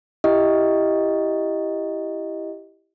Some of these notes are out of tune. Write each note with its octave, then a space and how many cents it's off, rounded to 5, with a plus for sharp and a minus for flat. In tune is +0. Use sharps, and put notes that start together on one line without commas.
E4 +5 G4 +0 D#5 +0